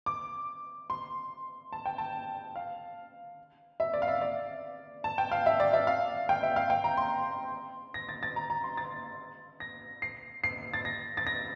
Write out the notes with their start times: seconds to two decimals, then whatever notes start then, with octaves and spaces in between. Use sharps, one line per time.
0.06 D6
0.90 C6
1.72 A5
1.86 G5
1.98 A5
2.56 F5
3.80 E5
3.94 D5
4.02 F5
4.08 E5
4.21 D5
5.04 A5
5.18 G5
5.31 F5
5.46 E5
5.60 D5
5.73 E5
5.87 F5
6.29 G5
6.43 E5
6.56 F5
6.70 G5
6.84 A#5
6.97 C6
7.94 A#6
8.09 A6
8.23 A6
8.36 A#5
8.50 A#5
8.64 C6
8.77 A6
9.60 A#6
10.02 C7
10.44 C7
10.74 A6
10.85 A#6
11.17 A6
11.27 A#6